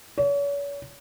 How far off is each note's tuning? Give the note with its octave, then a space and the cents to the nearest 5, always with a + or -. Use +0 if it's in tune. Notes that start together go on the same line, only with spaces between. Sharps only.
C#5 +40